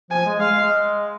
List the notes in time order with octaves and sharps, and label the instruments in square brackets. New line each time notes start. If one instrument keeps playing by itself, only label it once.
[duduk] F3 [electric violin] G#5
[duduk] G#3
[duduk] G#3 [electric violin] F5
[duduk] G#3
G#3